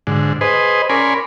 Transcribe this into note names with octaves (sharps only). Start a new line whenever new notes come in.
G#2 D3
G#4 B4 C5 D#5
C#4 A#4 D5 G#5 B5 C6